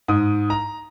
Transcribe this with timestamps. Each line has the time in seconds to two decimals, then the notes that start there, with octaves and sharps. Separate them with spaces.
0.08 G#2 D#6
0.50 A#5